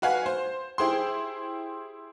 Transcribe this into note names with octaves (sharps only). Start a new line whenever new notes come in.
F#4 B4 F5 F#5 G#5
C5
E4 G4 G#4 C5 G5 C6